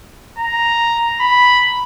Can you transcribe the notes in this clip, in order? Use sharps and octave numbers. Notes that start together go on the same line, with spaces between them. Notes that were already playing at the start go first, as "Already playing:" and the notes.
A#5
B5